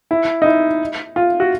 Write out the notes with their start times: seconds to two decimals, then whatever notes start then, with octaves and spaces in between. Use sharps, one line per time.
0.11 E4
0.42 D#4
0.46 E4
1.16 F4
1.40 F#4